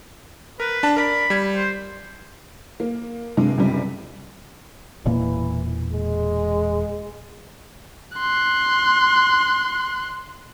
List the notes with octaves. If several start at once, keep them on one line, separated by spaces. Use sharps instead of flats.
A#4 B4
D4 A5
A#4 D5 B5
G3 G#6
C5
A#3
G2 C3 G#3
C#2 F#2 C3 G3
E1 A#2 E3 A#3
G#3
C6 F#6